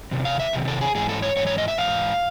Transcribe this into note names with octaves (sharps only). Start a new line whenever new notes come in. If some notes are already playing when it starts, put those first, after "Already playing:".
E2 C3 D#3
F5
E5
E2 C3 D#3
A4
G#4
G#2 E3 G#4
A4
C#5
G#2 E3 C#5
C#5
D#5
E5
G#2 E3 F5